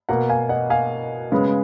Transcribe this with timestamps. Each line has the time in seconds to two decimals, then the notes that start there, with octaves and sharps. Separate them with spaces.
0.09 B2 A#3 F#5 A#5
0.29 F5 G#5
0.49 D#5 F#5
0.70 F5 G#5
1.32 C#3 G#3 B3